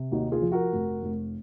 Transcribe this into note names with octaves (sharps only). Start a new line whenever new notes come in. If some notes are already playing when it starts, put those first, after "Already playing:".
Already playing: C3
D#2 D#4 F#4
F4 G#4
F3
F#4 A#4
F1
F1